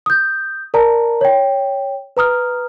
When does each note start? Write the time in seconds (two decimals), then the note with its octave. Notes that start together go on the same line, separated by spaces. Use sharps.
0.06 D#6 G6
0.74 A#4 D5 A5 A#5
1.21 C#5 G5
2.17 B4 A#5 D#6 F6